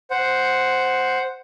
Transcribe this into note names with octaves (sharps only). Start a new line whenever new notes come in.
C5 F#5